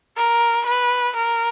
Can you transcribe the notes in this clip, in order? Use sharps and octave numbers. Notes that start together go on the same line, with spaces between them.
A#4
B4
A#4